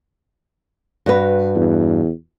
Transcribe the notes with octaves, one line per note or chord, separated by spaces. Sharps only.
G2 F#4 B4
E2